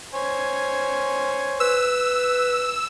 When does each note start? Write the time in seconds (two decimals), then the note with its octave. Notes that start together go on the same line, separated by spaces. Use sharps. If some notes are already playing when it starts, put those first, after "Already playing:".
0.14 C5 C#5 G#5
1.60 B4 E6